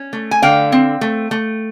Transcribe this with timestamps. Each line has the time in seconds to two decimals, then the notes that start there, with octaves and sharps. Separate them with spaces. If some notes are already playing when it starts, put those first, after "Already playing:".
Already playing: C#4
0.13 A3
0.31 G#5
0.42 D3 F5 G5
0.72 C4
1.01 A3
1.31 A3